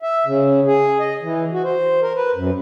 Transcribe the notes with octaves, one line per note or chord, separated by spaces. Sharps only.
E5
C#3
G#4
D#5
E3
F#4
C5
A#4
B4
F#2